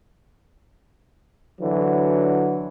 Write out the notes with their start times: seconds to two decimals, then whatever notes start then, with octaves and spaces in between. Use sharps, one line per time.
1.60 D3 E3 F#3